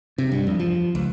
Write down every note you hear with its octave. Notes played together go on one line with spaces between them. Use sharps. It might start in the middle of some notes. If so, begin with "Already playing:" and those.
C3
G2
F2
F3
C#2